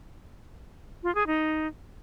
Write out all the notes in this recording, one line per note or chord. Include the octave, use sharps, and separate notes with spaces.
F4
G#4
D#4